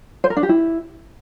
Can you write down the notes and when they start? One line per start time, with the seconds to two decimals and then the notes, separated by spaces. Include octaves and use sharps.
0.24 C5
0.30 A#4
0.37 D4
0.43 G4
0.49 E4